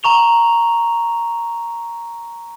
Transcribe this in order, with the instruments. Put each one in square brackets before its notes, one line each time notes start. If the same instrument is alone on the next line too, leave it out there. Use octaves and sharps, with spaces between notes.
[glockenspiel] A#5 C#6 F7 G7